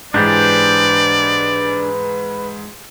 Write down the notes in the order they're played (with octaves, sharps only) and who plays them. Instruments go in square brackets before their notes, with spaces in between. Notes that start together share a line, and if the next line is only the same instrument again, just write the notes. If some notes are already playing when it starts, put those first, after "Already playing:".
[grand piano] G#2 E3 [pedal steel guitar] D4 G4 C5 [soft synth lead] B4 [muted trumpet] D5